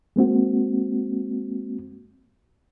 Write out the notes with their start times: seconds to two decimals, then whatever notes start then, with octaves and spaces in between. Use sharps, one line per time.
0.16 G#3 A#3 C4 F#4